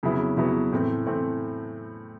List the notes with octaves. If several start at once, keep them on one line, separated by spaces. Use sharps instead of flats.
F2 C#3 F#3 B3 E4
F2 C#3 F#3 B3 E4
A2 E3 A3 C4
A2 E3 A3 C4